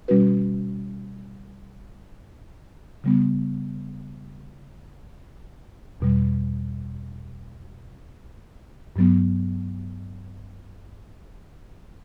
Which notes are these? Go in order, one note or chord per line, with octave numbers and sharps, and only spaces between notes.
B2 G3 C#4 F#4 B4
C#3 G3 B3
E2 B2 G3
G2 F#3 B3